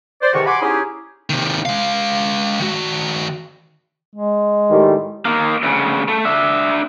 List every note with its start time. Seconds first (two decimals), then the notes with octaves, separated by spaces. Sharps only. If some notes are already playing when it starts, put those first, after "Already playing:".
0.21 C5 D5
0.33 G#2 C3 D#3 E3 F#4 C#6
0.46 F#5 G#5 B5 C6 D6
0.61 C#4 D#4 E4 G4 G#4
1.30 C3 D#3
1.65 G#3 F5
2.59 D#3 F#4
4.16 G#3
4.71 A2 D#3 G3
5.25 D#3 A#3
5.63 D2 C#3
6.08 A3
6.25 D4 E5